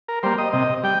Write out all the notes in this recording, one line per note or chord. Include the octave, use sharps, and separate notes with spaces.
A#4
G3 A#3 C5
D#5
C3 D#5
G3 G5